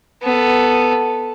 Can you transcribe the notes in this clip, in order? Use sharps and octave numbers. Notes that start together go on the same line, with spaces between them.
B3 A4